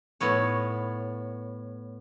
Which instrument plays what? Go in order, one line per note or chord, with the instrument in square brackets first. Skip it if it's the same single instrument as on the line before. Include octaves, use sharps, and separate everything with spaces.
[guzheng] A2 B3 C#5